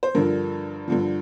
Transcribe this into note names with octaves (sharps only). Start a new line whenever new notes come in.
C5
G2 D3 F3 A#4
G2 D3 F3